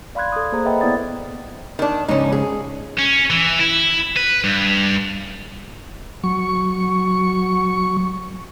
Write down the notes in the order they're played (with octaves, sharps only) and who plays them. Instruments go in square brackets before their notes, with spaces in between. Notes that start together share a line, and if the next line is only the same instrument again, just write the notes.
[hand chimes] D5 F5 B5 C6 F#6 G#6
A4 D#6
A#3 G#4 C5 A#5
B4 D#5 E5 F#5 G5 B5
B3 E4 D5 D#6 A6
[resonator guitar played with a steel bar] D#3 D4
[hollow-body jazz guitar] G#2 C#3 [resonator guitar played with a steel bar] C#4 D#4
[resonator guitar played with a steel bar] G#4
[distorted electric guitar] C#4
E3
E4
B4
G2
[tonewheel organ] F#3 C#6